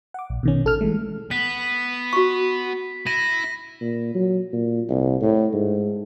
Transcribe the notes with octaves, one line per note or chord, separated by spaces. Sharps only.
F#5 D6
A#1
B2 D#3 C#4
A1 A4 F6
E3 G#3 A3
B3 B6
F#4 C#6
E4 A#6 D#7
A#2
F#3
A#2
C2
A2
G#2